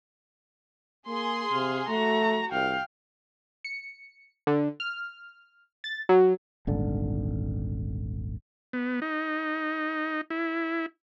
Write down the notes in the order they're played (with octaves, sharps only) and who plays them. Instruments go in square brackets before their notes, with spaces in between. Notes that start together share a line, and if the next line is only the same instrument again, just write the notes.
[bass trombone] A#3 [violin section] G#4 C6
[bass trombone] C3 [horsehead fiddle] F5
[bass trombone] A3 [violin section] F#4 [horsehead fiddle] A#5
[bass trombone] C2 [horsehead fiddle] F5 G5
[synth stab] C#7
D3
F6
A6
F#3
[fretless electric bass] D#1 G#1 D3
[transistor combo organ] B3
D#4
E4